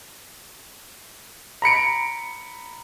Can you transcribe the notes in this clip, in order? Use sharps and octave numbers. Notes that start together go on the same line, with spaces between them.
A#5 B5 C#7 D7